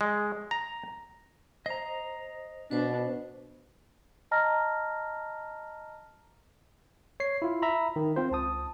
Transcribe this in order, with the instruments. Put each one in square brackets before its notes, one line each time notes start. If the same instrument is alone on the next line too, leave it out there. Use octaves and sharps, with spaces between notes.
[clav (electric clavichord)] G#3
A#5
[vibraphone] C5 [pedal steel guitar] D#5 A#5
[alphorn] B2 [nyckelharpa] D4 [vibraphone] B4 C5
[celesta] D#5 A5 A#5 F6 A#6
[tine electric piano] C#5 C7
E4 F4
E5 A#5 B5
D#3
C4 F4 C5
C#2 A5 D#6